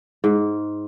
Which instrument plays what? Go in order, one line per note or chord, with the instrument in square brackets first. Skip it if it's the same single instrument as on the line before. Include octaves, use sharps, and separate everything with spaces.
[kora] G#2